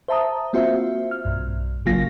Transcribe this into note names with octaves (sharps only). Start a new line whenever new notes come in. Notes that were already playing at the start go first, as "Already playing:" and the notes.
C5 E5 A5 A#5 D#6
A#3 C4 F4 F#4 C5 E5
F6
B1 G2
G#1 C#3 F#3 A#3 F4 A#6